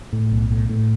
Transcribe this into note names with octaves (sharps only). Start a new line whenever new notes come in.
A2
B1
A2
A2